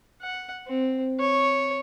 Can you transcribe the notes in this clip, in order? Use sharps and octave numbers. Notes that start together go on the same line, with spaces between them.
F#5
C4
C#5